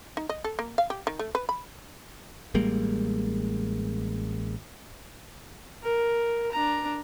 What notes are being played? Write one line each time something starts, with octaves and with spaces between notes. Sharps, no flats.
D#4
D#5
A4
A#3
F5
G4
D#3
A3
B4
B5
A1 G3 G#3 A#3
A#4
D4 A#5